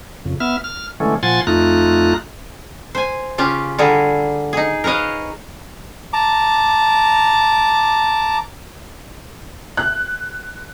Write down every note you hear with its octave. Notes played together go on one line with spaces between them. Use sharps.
F2 C#3
B3 E5 F6
F6
D3 E3 G#3 A3 C#4
A#2 F3 F#5 G#5 C6 A6
F2 A3 D#4 F4 A#5 F#6
C5 G#5
C#3 C#4 F4 G4
D3 G3 G#4 A#4
D#4 G#4
A#4 B4 C#5 D#5 F5
A5 A#5 D6
F#6